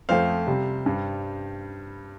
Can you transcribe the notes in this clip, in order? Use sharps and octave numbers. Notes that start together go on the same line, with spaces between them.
F2 F3 A3 C5 F5
C3 G3
G2 G3